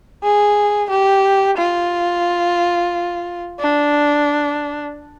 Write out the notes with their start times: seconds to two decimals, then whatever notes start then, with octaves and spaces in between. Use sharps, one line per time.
0.23 G#4
0.90 G4
1.57 F4
3.59 D4